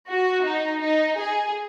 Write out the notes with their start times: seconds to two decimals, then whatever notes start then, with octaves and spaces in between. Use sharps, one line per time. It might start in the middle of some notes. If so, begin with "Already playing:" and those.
0.09 F#4
0.46 D#4
0.82 D#4
1.18 G#4